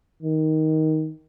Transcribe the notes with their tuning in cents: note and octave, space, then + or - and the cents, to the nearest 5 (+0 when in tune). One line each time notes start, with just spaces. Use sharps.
D#3 +10